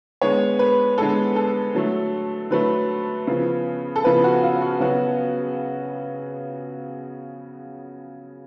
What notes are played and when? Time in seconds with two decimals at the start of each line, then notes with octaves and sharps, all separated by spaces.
0.22 D3 G#3 B3 C#5
0.59 B4
0.98 D3 G#3 B3 A4
1.36 A4
1.75 D3 F#3 A3
2.51 D3 F#3 A3 B4
3.27 C#3 F3 B3
3.96 A4
4.04 C#3 F3 B3 B4
4.24 F#4
4.43 F4
4.62 F#4
4.80 C#3 F#3 B3 F#4